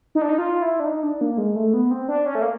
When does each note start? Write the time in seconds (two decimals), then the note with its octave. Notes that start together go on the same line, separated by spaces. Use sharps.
0.15 D#4
0.22 D4
0.29 D#4
0.38 F4
0.62 E4
0.80 D4
0.86 D#4
1.03 D4
1.21 A#3
1.38 G#3
1.56 A3
1.74 B3
1.91 C4
2.08 D4
2.26 C#4
2.35 A3
2.42 A#3